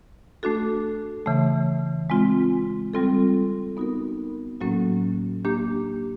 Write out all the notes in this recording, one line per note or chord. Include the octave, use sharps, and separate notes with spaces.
A3 D4 F#4 A4
C#3 E3 A3
G#3 C4 F4
G3 C4 F4 A4
B3 D#4 F#4 A#4
A2 F#3 A#3 C#4 F#4
A#3 D4 G4